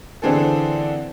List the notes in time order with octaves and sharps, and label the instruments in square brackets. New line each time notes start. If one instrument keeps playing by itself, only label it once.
[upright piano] D3 E3 C4 G#4 A4